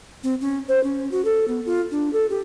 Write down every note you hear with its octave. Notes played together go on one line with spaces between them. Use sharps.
C4
C#4
C5
C#4
F#4
A4
B3
F4
D4
A4
G4